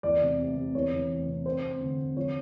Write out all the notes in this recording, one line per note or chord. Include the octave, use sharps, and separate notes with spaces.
E2 D5
C3
C3
C3
E2 C#5
E2
E3
C3
C4 C5
C4
D3
C4
F3 C#5